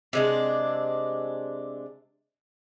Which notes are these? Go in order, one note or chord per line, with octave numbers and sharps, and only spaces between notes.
C3 G#3 D4